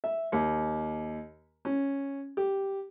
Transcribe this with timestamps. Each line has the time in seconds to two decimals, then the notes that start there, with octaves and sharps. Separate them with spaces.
0.04 E5
0.32 D#2
1.65 C#4
2.37 G4